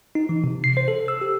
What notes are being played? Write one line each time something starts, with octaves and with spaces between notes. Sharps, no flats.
D#4
E3
C3
C7
C5
A4
E6
G4